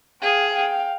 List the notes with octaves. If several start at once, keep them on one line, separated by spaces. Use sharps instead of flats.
G#4 F5 G5
F5 G5